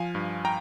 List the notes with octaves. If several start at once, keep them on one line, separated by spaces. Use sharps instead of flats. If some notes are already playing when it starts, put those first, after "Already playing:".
Already playing: F3 F5 G#5
G2
G5 A#5